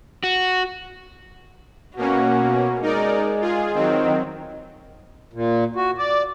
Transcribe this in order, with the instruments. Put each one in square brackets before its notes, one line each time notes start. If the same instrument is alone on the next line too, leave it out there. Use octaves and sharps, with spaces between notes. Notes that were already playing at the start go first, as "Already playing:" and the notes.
[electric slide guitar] F#4
[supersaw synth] B2 A#3 C#4 [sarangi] F#4
[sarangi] G#3 [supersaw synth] D#4 A#4 D5
[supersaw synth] F4 G#4
[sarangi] D#3 [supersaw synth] F#3 C4
[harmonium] A#2
F#4
D5